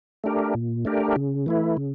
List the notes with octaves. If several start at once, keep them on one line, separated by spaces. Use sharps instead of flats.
A3 D4 G4 A#4
A#2
A3 D4 G4 A#4
C#3
E3 A3 E4
C#3